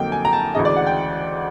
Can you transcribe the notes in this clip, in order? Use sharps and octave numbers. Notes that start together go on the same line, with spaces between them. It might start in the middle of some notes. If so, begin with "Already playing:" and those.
Already playing: F2 D3 F#3 A#3 D#4 G5
G#5
A#5
A5
D2 C#3 E3 G#3 D#5
D5
F#5
G5